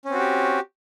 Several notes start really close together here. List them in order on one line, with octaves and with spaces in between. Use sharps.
C#4 C4 F#4 G4